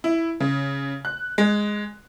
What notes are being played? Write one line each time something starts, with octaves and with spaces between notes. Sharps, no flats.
E4
C#3
F#6
G#3